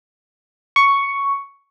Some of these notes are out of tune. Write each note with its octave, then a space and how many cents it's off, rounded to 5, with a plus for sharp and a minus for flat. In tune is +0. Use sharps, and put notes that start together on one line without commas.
C#6 +5